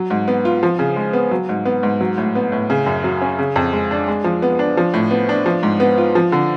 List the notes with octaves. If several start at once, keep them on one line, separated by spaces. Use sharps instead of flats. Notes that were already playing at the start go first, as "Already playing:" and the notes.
Already playing: F#3
G#2
B3
F4
F3
C#3
G#3
B3
F#3
G#2
B3
G#2
F#3
A2
B3
A2
C#3
F#2
F#3
C#4
C#3
F2
G#3
D4
G#3
F3
B3
D4
F3
A2
B3
D4
F3
G#2
B3
F4
F3
D3